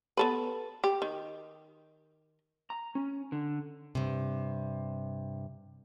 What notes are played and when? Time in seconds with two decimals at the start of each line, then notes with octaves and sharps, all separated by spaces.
0.17 B3 A4 B4
0.84 G4
1.02 D#3
2.70 A#5
2.95 C#4
3.32 D3
3.95 G2 C3